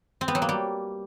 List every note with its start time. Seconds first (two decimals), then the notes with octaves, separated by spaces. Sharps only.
0.21 C4
0.28 B3
0.35 F#3
0.42 A#3
0.49 G3